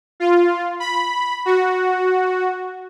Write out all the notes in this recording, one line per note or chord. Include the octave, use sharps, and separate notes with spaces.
F4
B5
F#4